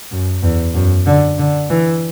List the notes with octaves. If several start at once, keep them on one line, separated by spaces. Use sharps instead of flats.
F#2
E2
F#2
D3
D3
E3